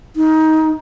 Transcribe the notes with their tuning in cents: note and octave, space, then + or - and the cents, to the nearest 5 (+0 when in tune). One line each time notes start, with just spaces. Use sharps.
D#4 +20